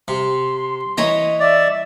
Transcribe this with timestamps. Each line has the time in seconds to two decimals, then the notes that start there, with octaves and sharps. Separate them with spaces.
0.08 C3 C6
0.98 E3 C#5 D#5 A#5
1.40 D5 E5